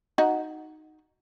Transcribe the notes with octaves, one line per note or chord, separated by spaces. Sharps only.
D#4 F#4 F#5